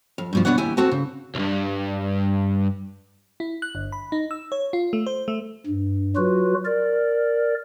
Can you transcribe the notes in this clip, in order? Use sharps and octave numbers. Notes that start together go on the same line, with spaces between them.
F2
G2 B2 F3
B2 E3 B3 D4 C#5 F#5
D#2 E4 G4 G#5
A3 C4 F#4 A5
C#3
B1 G2
E4
F#6
G1
B5
D#4
E6
C#5
F4
A3
C5
A3
G2
F#3 F4 F#4 B4
A#4 D5